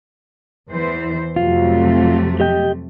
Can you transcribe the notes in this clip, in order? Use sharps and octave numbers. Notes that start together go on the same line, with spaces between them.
E2 E3 C5
F2 C3 F#3 A3 F4
G4 D#5 G5